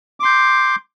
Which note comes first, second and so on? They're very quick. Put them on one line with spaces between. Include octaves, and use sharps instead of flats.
D6 C6 G6